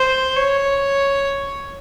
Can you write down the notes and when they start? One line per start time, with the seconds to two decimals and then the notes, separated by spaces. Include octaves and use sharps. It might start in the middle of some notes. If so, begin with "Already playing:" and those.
Already playing: C5
0.37 C#5